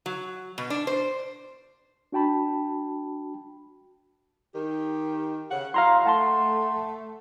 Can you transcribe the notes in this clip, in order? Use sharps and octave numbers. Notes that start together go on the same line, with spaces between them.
F#3
B2
D4
C5
D4 F#4 G5 A5 B5
D#3 G4
C#3 F#5
F#3 E4 F5 A#5 C6
A3 F#5 A5 C6